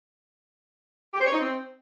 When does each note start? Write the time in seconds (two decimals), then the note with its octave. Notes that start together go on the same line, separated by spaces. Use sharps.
1.14 G4
1.20 C5
1.26 C#5
1.32 D#4
1.39 C4